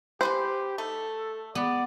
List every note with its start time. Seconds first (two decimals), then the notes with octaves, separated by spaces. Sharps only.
0.21 C4 G4 G#4 B4 C5
0.78 A3 D#4 A4
1.55 B3 D5